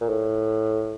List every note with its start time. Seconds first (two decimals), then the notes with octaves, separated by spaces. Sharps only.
0.01 A#2
0.09 A2